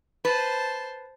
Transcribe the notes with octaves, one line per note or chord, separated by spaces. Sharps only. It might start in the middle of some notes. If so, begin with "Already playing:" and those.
B4 C5 A5